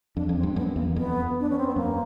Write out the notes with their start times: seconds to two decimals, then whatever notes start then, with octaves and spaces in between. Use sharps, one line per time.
0.16 F2 D4
0.29 F2
0.37 C4
0.43 G2
0.56 F#2 B3
0.76 E2 A#3
0.96 F2 B3
1.40 D4
1.50 C#4
1.58 C4
1.67 B3
1.76 F#2 A#3